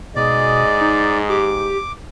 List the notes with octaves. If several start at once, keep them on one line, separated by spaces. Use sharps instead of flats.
G#2 B2 G#4 D5 D#5
D#4
G4 D6